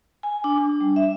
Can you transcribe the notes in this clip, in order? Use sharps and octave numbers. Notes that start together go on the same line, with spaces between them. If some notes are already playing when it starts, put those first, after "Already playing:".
G#5
D4
D4
G3
E5